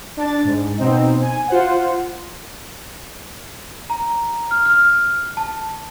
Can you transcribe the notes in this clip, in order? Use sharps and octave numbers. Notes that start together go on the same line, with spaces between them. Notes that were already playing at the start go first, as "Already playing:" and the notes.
D4 A6
G#2
B2 C4 D#4
G#5
F4 C5 F#5
A#5
F6
F6
A5